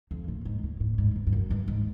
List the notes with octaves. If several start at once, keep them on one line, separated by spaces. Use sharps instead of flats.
F2
A2
G#2
A2
A2
G#2
G2
G2
F#2
G2
G#2